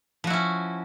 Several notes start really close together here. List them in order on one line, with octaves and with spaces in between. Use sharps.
F3 F#4 E4 C#4